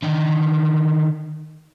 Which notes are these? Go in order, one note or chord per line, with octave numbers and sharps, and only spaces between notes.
D3 D#3